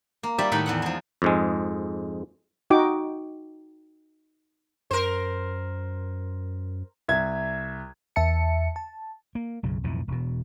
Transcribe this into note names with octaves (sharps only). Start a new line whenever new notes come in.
A#3
G3 F4 G4 D5 E5
A2 D#3 D#4 A4 F#5 B5
E2 B3 F#5
F3 G#3
F2 G#2 G#3
D#4 F#4 G5 D6
F#2 A#4 C5
C2 E5 G#6
E2 E5 A5 C#7
A5
A#3
B1 F#2 C#3
B1 F2 A2 E3
E1 B2